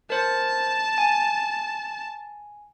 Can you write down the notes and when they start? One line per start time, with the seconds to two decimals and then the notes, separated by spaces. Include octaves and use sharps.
0.10 A#4 C5 A5
0.98 G#5